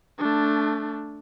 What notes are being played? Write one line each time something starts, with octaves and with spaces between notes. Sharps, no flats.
A3 D4